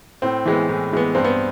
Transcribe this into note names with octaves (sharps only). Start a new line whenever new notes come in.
A2 C4
E3 G#3 B3
A2
E3 G#3 B3
G2 C4
B3